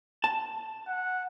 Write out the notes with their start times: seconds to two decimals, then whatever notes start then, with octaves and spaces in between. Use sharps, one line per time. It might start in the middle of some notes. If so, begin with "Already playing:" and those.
0.24 A5
0.88 F#5